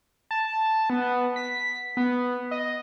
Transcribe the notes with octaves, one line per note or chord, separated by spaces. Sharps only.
A5
B3
B6
B3
D#5